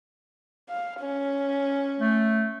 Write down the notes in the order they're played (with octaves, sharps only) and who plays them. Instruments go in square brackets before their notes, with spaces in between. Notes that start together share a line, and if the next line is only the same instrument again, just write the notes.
[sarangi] F5
C#4
[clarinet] A3